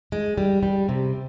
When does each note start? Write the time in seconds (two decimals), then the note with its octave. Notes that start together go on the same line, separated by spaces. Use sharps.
0.12 G#3
0.38 G3
0.63 G3
0.89 C3